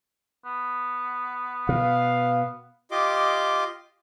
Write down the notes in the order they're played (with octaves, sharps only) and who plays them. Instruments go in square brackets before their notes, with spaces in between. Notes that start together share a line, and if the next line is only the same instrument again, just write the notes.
[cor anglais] B3
[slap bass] B2 [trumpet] F5
[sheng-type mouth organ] F4 G4 D#5 C6 D6